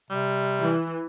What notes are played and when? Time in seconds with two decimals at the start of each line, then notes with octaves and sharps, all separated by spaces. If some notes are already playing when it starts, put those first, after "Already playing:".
0.10 C3 G3
0.60 E3